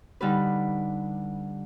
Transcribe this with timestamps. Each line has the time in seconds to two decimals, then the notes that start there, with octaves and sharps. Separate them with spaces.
0.21 D3 G3 D#4 B4